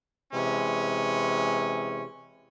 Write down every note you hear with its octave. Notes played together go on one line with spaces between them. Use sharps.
C3 E3 G#3 C#4